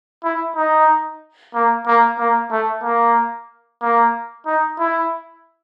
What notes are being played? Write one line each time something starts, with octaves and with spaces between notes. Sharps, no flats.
E4
D#4
A#3
A#3
A#3
A3
A#3
A#3
D#4
E4